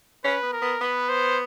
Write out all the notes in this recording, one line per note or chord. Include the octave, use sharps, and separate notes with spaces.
C#4 B4
B3
A#4
B3
B3 B4
C5